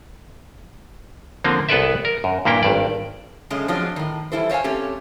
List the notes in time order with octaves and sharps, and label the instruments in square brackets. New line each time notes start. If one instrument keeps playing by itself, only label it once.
[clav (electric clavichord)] D3 F3 A#3 C4
C2 B3 A4 B4 D5 E5
A#4
F#2
G2 A#2 A#3 E4 G5
G#1 G2 D5
[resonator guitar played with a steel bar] F#2 C#3 G#3 A3 C#4
F3 F#3 G#3 C4 D4 F4
A2 D#3
E3 G3 E4 A4 C5
C5 C#5 E5 F5 G#5
A3 C4 C#4 G4